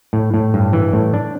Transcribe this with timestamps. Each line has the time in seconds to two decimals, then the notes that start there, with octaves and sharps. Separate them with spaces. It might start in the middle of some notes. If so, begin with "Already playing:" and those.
0.13 A2
0.34 A2
0.54 G2
0.73 E3
0.93 A2
1.14 D4